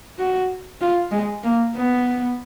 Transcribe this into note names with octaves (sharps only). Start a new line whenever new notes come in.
F#4
F4
G#3
A#3
B3